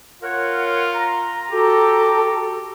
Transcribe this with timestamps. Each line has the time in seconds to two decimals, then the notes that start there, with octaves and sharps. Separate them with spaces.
0.23 F4 A#4 C#5 F#5
0.95 A#5
1.51 F#4 G4 A4